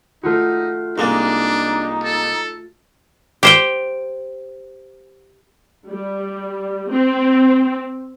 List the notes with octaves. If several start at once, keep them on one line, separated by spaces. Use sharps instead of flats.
A3 D#4 F4 F#4
C2 G#3 A#3 D4 D#4
A4
G4 C5 G5
G3
C4